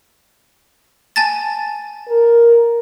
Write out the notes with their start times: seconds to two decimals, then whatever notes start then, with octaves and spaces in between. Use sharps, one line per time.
1.16 G#5 A5 A6
2.08 A#4